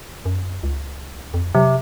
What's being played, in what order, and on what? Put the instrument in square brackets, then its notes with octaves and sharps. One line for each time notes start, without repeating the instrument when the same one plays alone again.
[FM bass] F#2
C#2
F2
[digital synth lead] C3 [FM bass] F#3